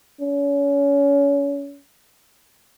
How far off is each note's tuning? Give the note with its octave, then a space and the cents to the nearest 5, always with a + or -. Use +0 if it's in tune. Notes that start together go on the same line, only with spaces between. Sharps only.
C#4 +30